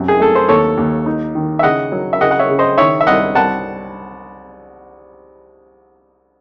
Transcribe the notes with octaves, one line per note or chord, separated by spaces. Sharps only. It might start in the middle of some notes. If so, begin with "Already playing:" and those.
Already playing: F#2 C3
G#4
A3 A4
C5
D#2 A4 C#5
D#2
D#4
D#3
E5
C#3 D#5 F#5
F#3
E5
C#3 D#5 F#5
F#5
C#5 E5
C#3
C5 D#5
D#3 C#5 E5
E5
C2 D#5 F#5
C2 F#5 A5